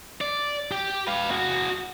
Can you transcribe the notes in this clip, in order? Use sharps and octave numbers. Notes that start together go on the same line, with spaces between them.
D5
G4
B4 F5
F#4 G#4